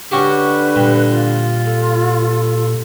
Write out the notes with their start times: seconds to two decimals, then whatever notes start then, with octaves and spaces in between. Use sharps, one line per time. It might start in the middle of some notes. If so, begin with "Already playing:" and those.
0.12 D3 C#4 F#4 G4 B4
0.76 G2 A#2
1.10 F4
1.67 A4